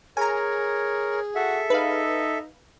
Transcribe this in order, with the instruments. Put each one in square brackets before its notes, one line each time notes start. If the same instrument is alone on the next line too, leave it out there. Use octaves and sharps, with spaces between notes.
[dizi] G#4 [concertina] A#4 C#5 [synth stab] G#5 A#5
[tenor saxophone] F#4 [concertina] A4 E5
[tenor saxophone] D#4 [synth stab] B4 F5